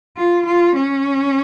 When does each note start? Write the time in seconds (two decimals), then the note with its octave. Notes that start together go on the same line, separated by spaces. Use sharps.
0.17 F4
0.46 F4
0.76 C#4